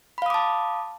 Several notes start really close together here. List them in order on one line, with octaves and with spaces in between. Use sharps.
B5 F5 D#6 D6 A5